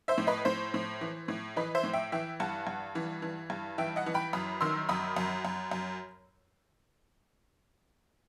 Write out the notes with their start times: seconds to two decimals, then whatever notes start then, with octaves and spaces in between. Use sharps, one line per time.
0.08 C5 E5
0.18 A2
0.27 B4 D#5
0.45 A2 C5
0.74 A2
1.01 E3
1.28 A2
1.56 E3 B4 D#5
1.75 C5 E5
1.84 A2
1.93 E5 G5
2.12 E3 E5 G5
2.40 G2 F#5 A5
2.67 G2
2.95 E3
3.22 E3
3.50 G2
3.78 E3 E5 G5
3.96 D#5 F#5
4.06 E3
4.14 G5 B5
4.33 F#2 B5 D#6
4.61 D#3 C6 E6
4.89 F#2 B5 D#6
5.17 F#2
5.45 F#2
5.71 F#2